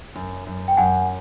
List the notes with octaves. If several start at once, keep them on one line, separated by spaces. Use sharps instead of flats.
F#2
F#2
G5
F#2 F#5 G#5